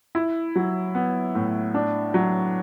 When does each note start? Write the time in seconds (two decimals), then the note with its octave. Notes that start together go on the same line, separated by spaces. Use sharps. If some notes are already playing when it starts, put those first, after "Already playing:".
0.15 E4
0.56 F#3
0.95 B3
1.35 A2
1.74 D4
2.14 F#3